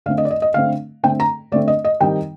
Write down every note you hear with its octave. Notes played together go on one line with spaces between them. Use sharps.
D3 A3 C4 F5
D#5
D5
D#5
D#5
D3 A3 C4 F5
D3 A3 C4 G5
A#5
D3 A3 C4 D5
D#5
D#5
D#3 G3 C4 D#4 G5